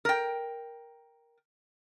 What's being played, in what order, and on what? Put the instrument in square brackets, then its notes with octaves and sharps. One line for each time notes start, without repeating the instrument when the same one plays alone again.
[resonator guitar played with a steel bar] A#4 G5